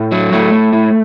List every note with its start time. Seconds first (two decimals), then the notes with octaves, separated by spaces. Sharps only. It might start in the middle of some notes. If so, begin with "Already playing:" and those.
Already playing: A2
0.11 F#3
0.32 A2 A3
0.52 A2
0.73 A2